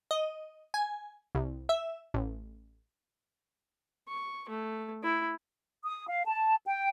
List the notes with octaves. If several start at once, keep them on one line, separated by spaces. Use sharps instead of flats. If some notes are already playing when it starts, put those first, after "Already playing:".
D#5
G#5
C2
E5
A1
C#6
A3
E4
D#6
F5
A5
G5